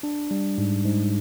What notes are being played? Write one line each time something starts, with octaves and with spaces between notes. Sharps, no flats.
D4
G3
G#2
G#2